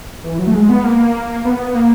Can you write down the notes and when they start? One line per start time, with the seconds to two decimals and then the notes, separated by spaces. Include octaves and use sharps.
0.24 E3
0.39 F#3
0.47 A3
0.54 G#3
0.69 B3
0.84 A#3
1.45 B3
1.75 A#3